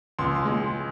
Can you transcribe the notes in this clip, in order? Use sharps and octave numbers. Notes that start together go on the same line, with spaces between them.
C#2 C6
C6
G#3